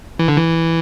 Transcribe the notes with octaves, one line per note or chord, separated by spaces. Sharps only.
E3
D3
E3